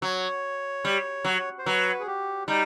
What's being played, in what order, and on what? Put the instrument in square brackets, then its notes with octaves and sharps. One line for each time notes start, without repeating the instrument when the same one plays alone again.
[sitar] F#3 [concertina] C#5
[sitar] G3
F#3
[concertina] C5
[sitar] F#3 [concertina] B4
[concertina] G#4
G4
[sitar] G3 [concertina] D#4